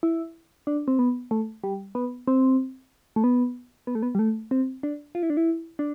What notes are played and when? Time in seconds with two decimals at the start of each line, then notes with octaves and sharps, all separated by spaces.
0.03 E4
0.67 D4
0.88 C4
0.99 B3
1.31 A3
1.63 G3
1.95 B3
2.28 C4
3.16 A3
3.24 B3
3.87 B3
3.95 A3
4.03 B3
4.15 G3
4.19 A3
4.51 C4
4.83 D4
5.15 F4
5.23 E4
5.30 D4
5.37 E4
5.79 D4